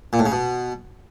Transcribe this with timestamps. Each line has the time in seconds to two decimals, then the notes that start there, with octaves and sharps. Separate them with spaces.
0.13 A#2
0.19 A2
0.26 C#3
0.32 B2